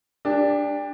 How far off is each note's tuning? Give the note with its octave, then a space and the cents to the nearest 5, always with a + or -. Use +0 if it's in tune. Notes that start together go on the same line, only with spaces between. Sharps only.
D4 +0 G4 +30